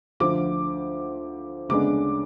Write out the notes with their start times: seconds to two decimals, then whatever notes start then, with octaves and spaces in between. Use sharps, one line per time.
0.20 D2 D3 F3 D6
1.69 D2 C#3 G#3 B3 D4 D6